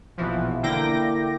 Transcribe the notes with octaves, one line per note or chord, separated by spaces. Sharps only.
A#1 B2 E3 F3
D3 A#3 E4 G5 D6 A#6